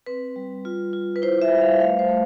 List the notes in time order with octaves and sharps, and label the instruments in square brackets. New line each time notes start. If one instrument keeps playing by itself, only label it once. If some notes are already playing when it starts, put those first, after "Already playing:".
[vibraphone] C4 B4
G3
F4
F4
B4
E4 C5
E5
G3
F5
A3 F5
C5
A3